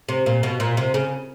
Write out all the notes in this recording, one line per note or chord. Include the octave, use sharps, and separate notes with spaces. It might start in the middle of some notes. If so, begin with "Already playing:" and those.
C3
A#2
B2
A#2
C3
C#3